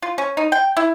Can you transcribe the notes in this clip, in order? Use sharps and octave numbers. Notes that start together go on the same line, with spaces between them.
F4
C#4
D#4
G5
E4